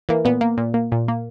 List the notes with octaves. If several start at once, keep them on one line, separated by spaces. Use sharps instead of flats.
E3 A#3
A#2 B3
A#3
A#2
A#3
A#2
A#3